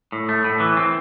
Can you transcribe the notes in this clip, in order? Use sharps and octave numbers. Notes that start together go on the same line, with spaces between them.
A2
A3
A2
E3
C4